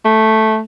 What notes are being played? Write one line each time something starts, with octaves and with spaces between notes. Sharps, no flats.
A3